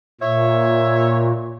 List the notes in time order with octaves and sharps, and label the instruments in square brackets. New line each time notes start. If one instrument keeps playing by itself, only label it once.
[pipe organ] A#2 [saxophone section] C#5 E5